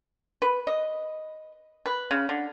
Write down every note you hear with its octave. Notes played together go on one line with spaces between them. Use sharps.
B4
D#5
B4
C#3
D3